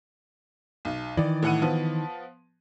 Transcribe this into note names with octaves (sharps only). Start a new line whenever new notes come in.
B1
D#3 E3 D5
A2 F#5 D#7
F3 B3